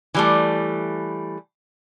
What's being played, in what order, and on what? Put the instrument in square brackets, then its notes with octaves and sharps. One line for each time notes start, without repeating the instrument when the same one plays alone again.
[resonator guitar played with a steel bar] E3 G3 A3